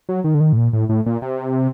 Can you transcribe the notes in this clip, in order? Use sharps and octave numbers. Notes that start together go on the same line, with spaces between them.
F#3
D#3
D3
D#3
A2
A#2
A2
A2
A#2
C3